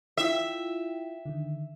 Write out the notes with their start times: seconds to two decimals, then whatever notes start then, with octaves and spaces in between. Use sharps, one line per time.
0.17 E4 F4 E5 G5
1.25 D3 D#3